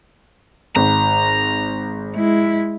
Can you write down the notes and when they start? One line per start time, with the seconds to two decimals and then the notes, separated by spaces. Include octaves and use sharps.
0.76 G#1 A#5
2.15 G#3 E4